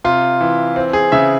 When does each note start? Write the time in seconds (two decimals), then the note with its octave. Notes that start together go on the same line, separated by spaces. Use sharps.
0.04 C3 F4
0.41 E3
0.76 C4
0.93 G#4
1.12 C#3 E5